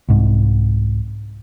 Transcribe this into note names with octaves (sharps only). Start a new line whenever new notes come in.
C2 G#2